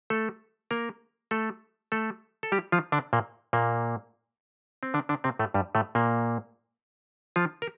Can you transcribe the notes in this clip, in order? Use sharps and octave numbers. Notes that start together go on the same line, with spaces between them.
A3 A4
A#3 A#4
A3 A4
A3 A4
A4
G3 G4
F3 F4
D3 D4
A#2 A#3
A#2 A#3
C4
D3 D4
D3 D4
C3 C4
A2 A3
G2 G3
A2 A3
A#2 A#3
F3 F4
A#4